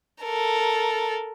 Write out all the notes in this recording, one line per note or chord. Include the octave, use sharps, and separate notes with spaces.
A4 A#4